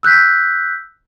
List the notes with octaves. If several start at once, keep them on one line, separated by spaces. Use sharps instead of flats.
E6 F#6 G6 B6